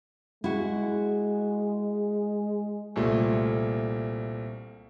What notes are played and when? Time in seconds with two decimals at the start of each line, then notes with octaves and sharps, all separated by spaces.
0.44 G#3 E4 F#4
2.96 C2 A#2 A3